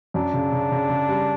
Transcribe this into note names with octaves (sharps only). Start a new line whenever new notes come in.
F#2 D4
C#3
C#3
C#3
C#3
G3